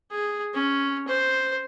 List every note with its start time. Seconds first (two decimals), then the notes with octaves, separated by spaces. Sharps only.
0.11 G#4
0.54 C#4
1.08 C5